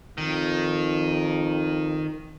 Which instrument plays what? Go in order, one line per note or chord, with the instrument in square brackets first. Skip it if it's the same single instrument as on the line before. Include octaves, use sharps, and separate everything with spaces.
[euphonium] F2 [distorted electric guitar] D#3